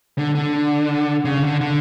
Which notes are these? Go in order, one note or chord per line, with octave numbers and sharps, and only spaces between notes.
D3
D3
C#3
D3
D3